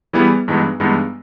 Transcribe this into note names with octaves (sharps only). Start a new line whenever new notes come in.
E3 G3 B3 E4 G#4
G2 E3 G#3 B3 D#4
G2 E3 G#3 B3 D#4